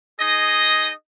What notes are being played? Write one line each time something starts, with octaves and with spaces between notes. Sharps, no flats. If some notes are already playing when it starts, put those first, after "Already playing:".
D#4 G#4 D#5